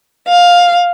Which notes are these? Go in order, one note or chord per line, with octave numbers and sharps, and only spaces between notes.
F5